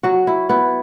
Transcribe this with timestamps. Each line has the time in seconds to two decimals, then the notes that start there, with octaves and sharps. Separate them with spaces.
0.03 F#3 F#4
0.27 E4
0.49 B3 E4